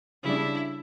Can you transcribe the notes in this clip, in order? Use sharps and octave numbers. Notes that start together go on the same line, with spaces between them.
C#3 G3 D4 E4